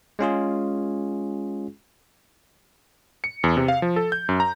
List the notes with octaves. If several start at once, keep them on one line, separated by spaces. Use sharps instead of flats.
G#3 C#4 F4 G#4
C#7
E2
C3
F5
F3
A4
G6
F#2
A#5